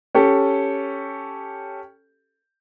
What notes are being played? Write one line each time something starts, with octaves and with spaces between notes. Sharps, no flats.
C#4 G4 A4